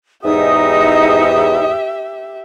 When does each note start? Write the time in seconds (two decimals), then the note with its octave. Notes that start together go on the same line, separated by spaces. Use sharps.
0.25 E2 G#2 D#4 G4 E5 D#6